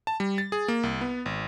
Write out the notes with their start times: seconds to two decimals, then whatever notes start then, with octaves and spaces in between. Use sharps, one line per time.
0.07 A5
0.20 G3
0.38 A6
0.52 G#4
0.68 A#3
0.83 C2
1.01 B3
1.26 G#1